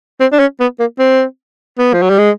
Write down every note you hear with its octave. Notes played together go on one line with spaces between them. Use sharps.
C4
D4
C#4
B3
A#3
C4
B3
F3
F#3
G3
G#3